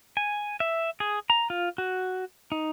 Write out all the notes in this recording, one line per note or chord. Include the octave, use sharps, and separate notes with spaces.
G#5
E5
G#4
A#5
F4
F#4
D#4